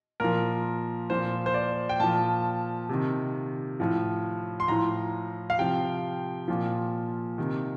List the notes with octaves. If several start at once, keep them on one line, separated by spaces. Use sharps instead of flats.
A#2 F3 A#4
A#2 F3 C5
C5
D5
G5
A#2 F3 A5
C3 D#3
A2 F3
C6
A2 F3 A#5
F5
C3 F3 G5
A#2 F3
C3 D#3